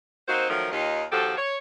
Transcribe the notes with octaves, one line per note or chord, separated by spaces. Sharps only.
A#3 C4 D#4 F#4 C5
D#3 F3 F#3 A3 A#4
D#2 D#3 D#4 F4 G4 D#5
D#2 F3 F#4 G4 A4
C#5